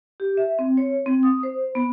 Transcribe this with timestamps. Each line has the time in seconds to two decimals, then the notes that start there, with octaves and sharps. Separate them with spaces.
0.20 G4
0.37 E5
0.59 C4
0.77 C#5
1.06 C4
1.23 D#6
1.43 C5
1.75 B3